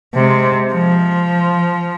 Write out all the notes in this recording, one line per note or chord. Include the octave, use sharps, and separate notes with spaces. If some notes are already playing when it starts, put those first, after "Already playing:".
C3 G#3
F3